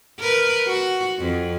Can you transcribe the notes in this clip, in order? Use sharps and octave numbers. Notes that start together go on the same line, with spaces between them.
A#4 B4
F#4
F2